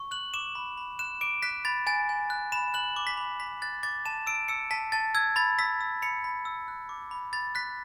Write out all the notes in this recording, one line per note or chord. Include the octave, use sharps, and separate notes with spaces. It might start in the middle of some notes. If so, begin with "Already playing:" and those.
Already playing: C#6
F#6 F#7
D6 E7
B5
B5
F#6 E7
D6 D7
F#6 B6
B5 A6
G#5 A6
G#5
F#6
B5 E7
F#6 F#7
D6
B6
B5
B5 B6
F#6 A6
D6 A6
A5 E7
E6 D7
E6 C#7
A5 B6
A5 A6
E6 G#6
B5 A6
E6 B6
E6
B5 C#7
B5
E6
F#6
D6
B5
B5 A6
F#6 B6